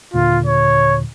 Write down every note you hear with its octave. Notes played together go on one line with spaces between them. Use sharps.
D#2 A#2 D3 F4
C#5